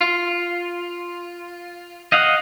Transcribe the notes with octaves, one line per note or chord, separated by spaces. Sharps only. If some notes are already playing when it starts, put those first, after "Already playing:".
F4
D#5 F5 F#5